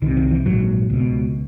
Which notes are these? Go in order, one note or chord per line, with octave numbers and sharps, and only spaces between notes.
C2 C3 D#3
D#3
E3
A#1 G#2 F#3
C#2 B2